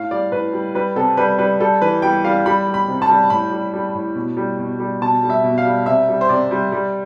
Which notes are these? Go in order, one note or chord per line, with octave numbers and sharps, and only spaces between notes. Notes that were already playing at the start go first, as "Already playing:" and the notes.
Already playing: A2 F5
G3 D5
A2 B4
G3
G3 B4
C3 A4
G3 B4
G3 B4
G3 A4
E3 B4
G3 G5
G3 F5
G3 B5
G3
B5
C3
A5
G3
A2 B5
G3
G3
A2
B2
G3
B2
G3
B2 A5
G3
E5
B2
F5
G3
C3 E5
G3
C5
C3 D5
G3
G3